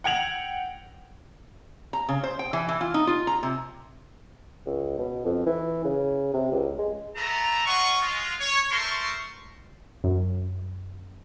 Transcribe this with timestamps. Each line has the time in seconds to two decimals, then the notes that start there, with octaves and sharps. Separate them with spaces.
0.04 F#5 G5 G#6 F7 F#7
1.93 A#5
2.09 C#3
2.23 C5
2.39 G5
2.53 E3
2.68 E3
2.81 F4
2.94 D#4
3.07 F4
3.27 A#5
3.43 C3
4.66 C#2
4.99 B2
5.25 F2
5.46 E3
5.84 C#3
6.34 C3
6.52 C#2
6.78 G#3
7.15 A3 B3 A5 A#5
7.66 C#4 F4 D#5 F#5 C#6
8.01 G#3 F4
8.40 C#5
8.71 A3 A#4 C5 A5 C6 C#6
10.04 F#2